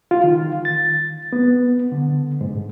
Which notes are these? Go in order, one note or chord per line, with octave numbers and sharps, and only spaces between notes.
F4
D#3
A6
B3
D3
G#2